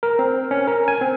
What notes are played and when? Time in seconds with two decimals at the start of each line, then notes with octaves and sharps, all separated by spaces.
0.03 A#4
0.19 C4
0.51 C#4
0.67 A#4
0.88 G#5
1.01 C4